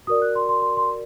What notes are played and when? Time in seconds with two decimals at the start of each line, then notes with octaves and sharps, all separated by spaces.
0.07 F#4 A#4 D5 D#6
0.22 F#6
0.35 C6
0.49 C6
0.62 C6
0.77 C6